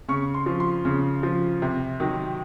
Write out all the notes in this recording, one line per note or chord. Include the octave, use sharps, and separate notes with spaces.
C#3 C#6
C6
F3
C6
C#3
F3
C3
D#3 F#3